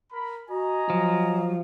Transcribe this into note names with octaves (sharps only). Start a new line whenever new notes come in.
A#4 B5
F#4 D#5 G#5 A#5
F3 F#3